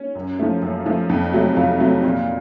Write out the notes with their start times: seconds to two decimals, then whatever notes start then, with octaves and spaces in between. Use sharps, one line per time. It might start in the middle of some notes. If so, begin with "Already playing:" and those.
Already playing: C#4
0.15 F#2
0.39 F3 A3
0.62 F#2
0.86 F3 A3
1.09 F2
1.33 C3 F#3 A3
1.56 F2 F4
1.80 C3 F#3 A3
2.04 A#2